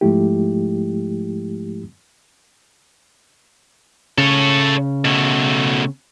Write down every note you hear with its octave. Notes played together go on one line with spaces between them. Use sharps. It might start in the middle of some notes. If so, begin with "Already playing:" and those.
G#2 F3 G#3 A3 E4 G4
C#3 A4 C#5
B2 A3